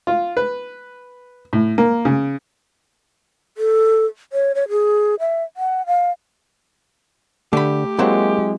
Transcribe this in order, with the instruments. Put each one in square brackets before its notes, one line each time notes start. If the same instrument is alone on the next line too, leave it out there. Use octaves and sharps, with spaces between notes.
[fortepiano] F4
B4
A2
A#3
C#3
[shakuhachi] A4
C#5
C#5
G#4
E5
F#5
F5
[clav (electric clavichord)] D3 [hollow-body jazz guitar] A3 B5 [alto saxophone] G4
[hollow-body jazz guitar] F#3 C4 E4 [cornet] G#3 [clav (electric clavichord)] A#3 F#4